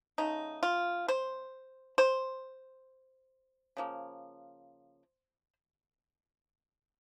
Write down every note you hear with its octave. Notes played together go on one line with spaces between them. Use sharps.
C#3 A3 D#4
F4
C5
C5
C#3 F3 A#3